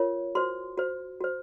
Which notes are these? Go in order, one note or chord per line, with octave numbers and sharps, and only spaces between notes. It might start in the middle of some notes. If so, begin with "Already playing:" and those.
Already playing: F4 A#4 C#5
F#4 C5 C6
F#4 C5
F#4 C5